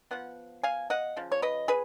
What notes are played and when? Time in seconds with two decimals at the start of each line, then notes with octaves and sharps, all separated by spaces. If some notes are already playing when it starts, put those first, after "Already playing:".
0.11 F3 B3 F#5
0.63 F5 G#5
0.90 D#5 F#5
1.16 C#3 F3
1.32 C#5
1.42 B4 D#5
1.68 G#4 B4